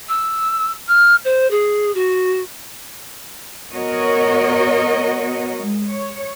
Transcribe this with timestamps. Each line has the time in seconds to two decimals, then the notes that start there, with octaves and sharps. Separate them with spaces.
0.08 E6
0.87 F6
1.24 C5
1.50 G#4
1.94 F#4
3.72 B3 F#4 A#4 C#5 D#5
5.61 G#3
5.90 C#5